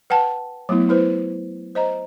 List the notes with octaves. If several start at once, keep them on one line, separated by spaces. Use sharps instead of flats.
B4 F#5 G5 A5
F#3 A3 B3 E4
E4 B4 C5
C5 D#5 A#5